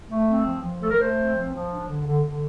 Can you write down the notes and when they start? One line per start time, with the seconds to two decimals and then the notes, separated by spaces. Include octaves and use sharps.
0.10 A3
0.28 C4
0.45 F3
0.63 F3
0.81 A3 A4
0.90 A#4
0.99 A3 C5
1.17 C4
1.35 F3
1.52 F3
1.70 D4
1.88 D3
2.06 D3
2.23 D3